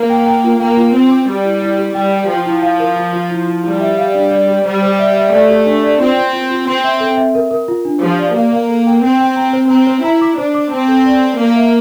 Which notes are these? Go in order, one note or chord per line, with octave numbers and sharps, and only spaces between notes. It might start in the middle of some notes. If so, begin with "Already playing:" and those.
Already playing: A#3
G5
G5
F4
A#3 G5
F4
C4 C5
D6
G3 G4
E4
E4
G4
G3 G5
G5
F3 G5
E4
F5
A#4
F4
F4
E4
E4
G3 E4
E5
F5
D4
D5
G4
G3 C5
C5
E5
E5
A3 D5
G4
D4
D5
C4 F4
C5
F4
F4
C4 C6
E5
A4
E5
A#4
A#4
F4
D4
F3 G4
D5
A#3 F5
F5
A4
G5
C4 G5
G5
A#5
C5
C4 A#5
C5
E4 A#5
D6
D4 C5
D6
C4 A5
A4
D5
A5
A#3 A#4
E5